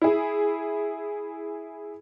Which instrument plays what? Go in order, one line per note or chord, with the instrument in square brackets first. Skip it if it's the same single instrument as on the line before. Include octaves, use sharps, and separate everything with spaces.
[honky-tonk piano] E4 G#4